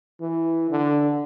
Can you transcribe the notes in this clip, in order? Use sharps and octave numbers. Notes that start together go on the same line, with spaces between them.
E3
D3